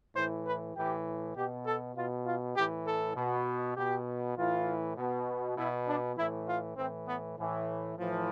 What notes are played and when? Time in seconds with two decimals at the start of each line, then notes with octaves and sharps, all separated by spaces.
0.15 A2 E3 C5
0.46 B4
0.75 A2 E3 G4
1.36 B2 G4
1.66 A4
1.96 B2 F4
2.26 F4
2.57 A2 E3 G4
2.86 A4
3.16 B2
3.77 B2 G4
4.36 A2 E3 F4
4.97 B2
5.58 B2 E4
5.87 D4
6.17 A2 E3 E4
6.48 F4
6.77 A2 E3 C4
7.07 B3
7.38 A2 E3
7.98 A2 E3 F3